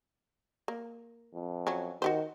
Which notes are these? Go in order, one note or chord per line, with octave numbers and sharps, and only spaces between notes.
A#3
F2
F#3 C#4
D#3 F#4 G4 C5